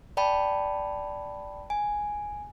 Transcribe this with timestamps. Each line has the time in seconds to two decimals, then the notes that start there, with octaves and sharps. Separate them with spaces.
0.17 D5 G5 A5 B5
1.70 G#5